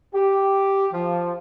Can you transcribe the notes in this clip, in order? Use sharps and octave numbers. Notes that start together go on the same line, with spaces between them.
G4
F3